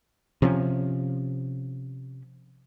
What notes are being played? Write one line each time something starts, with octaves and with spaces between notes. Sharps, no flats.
C3 F3 C#4